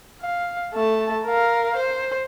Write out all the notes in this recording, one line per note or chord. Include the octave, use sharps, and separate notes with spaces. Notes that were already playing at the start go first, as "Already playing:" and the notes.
F5
A3 A5
A#4 F5
C5